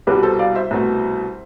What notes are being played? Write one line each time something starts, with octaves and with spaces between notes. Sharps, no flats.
C2 B2 G3 G4 B4
A4 C5
D5 F5
C5 E5
C2 B2 A3